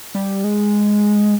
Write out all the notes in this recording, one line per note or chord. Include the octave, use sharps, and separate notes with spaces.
G3
G#3